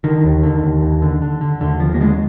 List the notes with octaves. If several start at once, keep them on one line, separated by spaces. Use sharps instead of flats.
D3 D#3
D#2
D3
D#2
D#2
D3
D3
D3
D#2 D3
D#2 F3
A#3
D3 G#3